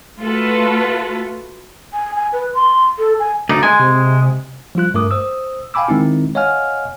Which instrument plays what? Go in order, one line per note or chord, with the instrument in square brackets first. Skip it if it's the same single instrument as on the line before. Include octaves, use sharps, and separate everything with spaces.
[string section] A3 F4 F#4 A4 B4
[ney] G#5
G#5
B4
C6
A4
G#5
[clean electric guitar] D2 D#4 [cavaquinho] D5
[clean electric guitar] G#3 [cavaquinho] G#5
[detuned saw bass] C3
[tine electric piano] F3 G3 F4 F#6
G2 A3 A#4 D6 D#6
C5 D#6 E6
F5 G5 G#5 B5 D6 E6
D#3 G#3 C4 D#4 E4
C#5 D#5 F5 F#5 G#5 F6